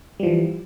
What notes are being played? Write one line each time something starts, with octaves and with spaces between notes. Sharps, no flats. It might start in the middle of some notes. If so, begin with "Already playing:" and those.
E3 F3 G3